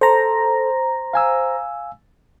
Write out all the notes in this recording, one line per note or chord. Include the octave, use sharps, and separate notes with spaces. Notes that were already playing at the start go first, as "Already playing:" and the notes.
A4 C5 A#5
F5 G#5 E6